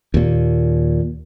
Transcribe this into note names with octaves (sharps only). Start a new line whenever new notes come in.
D#2 A#2